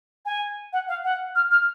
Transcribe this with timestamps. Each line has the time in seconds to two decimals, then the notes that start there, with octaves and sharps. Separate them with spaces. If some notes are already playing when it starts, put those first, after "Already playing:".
0.26 G#5
0.73 F#5
0.88 F5
1.04 F#5
1.35 F6
1.51 F6